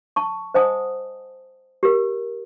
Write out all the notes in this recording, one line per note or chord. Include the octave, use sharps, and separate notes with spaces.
A5 C#6
C5 D#5 F#5 G#5 A5 D#6
G4 A#4